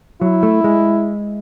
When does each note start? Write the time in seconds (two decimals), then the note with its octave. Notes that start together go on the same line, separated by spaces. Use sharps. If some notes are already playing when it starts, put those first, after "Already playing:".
0.21 F#3 E4
0.43 A3
0.64 G#3